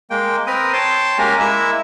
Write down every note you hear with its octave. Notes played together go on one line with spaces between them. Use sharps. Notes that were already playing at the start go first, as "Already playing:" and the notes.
G#3 A#3 G5
C4 A#4 B4 D#6
C#5 G5 A5 C6
G#3 A#3 C#4 G4 A#4 G#5
G#3 A#3 E4 E5 E6